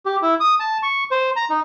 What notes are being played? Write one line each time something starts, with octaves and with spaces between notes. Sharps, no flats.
G4
E4
D#6
A5
C#6
C5
A#5
D#4